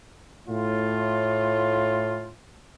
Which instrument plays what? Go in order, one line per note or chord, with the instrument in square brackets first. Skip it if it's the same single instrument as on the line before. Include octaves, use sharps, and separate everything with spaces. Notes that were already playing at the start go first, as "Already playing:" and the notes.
[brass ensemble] A2 F4